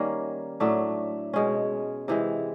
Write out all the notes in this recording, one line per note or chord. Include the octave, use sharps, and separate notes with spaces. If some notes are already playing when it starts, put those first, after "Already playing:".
Already playing: D#3 G3 A#3 C#4
A2 F#3 A3 D4
B2 G#3 C#4
C3 E3 G#3